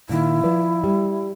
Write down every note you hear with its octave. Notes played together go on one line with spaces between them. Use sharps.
A#2 D#3 E4
F3 B4 D5
G3